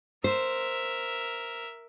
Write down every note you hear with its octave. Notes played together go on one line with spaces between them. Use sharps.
A#4 C5 E5